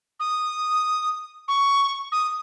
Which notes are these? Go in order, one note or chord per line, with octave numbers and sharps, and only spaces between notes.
D#6
C#6
D#6